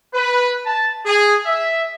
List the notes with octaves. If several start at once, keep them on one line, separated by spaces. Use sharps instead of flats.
B4
A5
G#4
E5